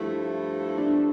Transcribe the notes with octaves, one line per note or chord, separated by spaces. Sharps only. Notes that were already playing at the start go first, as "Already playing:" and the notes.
Already playing: G2 F3 A3 E4
D4